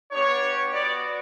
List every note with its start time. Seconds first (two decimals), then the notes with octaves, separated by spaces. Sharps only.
0.11 B3 D4 G4 C#5
0.72 B3 F#4 D5